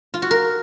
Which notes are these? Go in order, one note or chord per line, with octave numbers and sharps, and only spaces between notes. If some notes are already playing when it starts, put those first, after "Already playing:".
F4
F#4
A#4